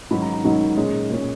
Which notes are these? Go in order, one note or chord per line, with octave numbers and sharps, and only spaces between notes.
G#2 D#3 F#3 C#4 B5
A#5
A#5
G#2 D#3 F#3 C#4
A#2 G#3 C#4 C#5
A#2 G#3 C#4